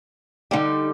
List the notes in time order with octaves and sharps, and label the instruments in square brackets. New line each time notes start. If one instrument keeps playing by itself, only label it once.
[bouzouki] D3 G3 [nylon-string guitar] D#4 F#5 G5